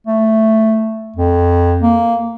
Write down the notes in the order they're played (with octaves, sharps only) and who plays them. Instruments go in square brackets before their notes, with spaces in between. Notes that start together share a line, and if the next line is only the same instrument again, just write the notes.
[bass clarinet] A3
F2
A#3